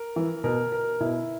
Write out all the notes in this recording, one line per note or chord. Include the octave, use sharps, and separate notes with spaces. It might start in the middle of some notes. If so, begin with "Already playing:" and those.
Already playing: A#4
E3
B2 A#4
A#4
B2 E4